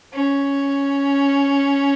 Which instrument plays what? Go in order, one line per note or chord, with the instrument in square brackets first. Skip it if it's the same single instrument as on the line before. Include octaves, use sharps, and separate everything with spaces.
[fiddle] C#4